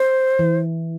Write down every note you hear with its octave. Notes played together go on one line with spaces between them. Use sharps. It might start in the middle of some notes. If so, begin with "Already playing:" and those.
Already playing: C5
E3